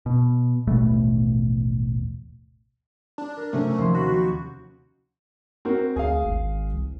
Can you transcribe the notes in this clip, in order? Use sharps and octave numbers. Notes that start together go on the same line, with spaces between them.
B2
A1 D#2 B2 A3
D4
A#4
C3 F#3 A3 C#4
D#2 F3 C6
F#4 B5 F#6
G4
C4 F#4 A#4
D2 G#4 F5
G#1
C2